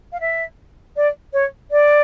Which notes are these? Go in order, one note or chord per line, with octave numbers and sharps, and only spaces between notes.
F5
E5
D5
C#5
D5